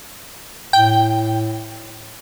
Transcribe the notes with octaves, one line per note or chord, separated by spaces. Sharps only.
A2 G5